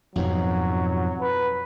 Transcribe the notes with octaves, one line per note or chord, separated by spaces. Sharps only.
F2 G#2 B2 F#3
B4